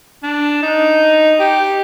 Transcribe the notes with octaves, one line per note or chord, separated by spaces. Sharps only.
D4
D#4
G4